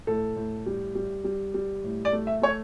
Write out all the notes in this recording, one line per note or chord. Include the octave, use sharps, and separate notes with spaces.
A2 A4
A2
G3
G3
G3
G3
A2
D5
A3
E5
A3 C#5